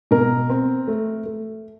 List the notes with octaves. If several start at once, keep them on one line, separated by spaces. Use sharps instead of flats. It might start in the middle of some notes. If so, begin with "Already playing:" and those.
B2 A#4
C4
A3
A3